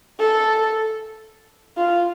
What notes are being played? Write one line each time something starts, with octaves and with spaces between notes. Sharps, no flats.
A4
F4